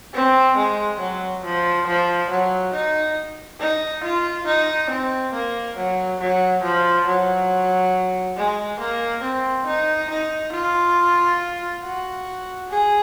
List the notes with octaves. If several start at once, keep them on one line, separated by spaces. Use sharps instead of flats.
C4
G#3
F#3
F3
F3
F#3
D#4
D#4
F4
D#4
C4
A#3
F#3
F#3
F3
F#3
G#3
A#3
C4
D#4
D#4
F4
F#4
G#4